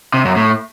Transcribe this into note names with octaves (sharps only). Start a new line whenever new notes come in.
C3
F#2
A2